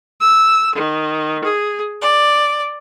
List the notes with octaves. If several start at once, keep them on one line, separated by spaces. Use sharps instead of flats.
E6
D#3
G#4
D5